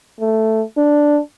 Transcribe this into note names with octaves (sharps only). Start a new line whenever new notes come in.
A3
D4